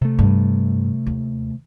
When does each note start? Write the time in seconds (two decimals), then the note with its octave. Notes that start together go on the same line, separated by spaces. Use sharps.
0.01 C3 A3
0.19 G2
1.07 D#2